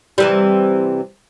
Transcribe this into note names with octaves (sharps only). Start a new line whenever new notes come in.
C3 E3 G3